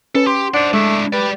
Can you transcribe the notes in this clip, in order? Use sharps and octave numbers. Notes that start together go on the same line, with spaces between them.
C#4 A4 B4
G4 C6
D4 C5 F#5
G#3 A3 D4 E4
G4 B4 D5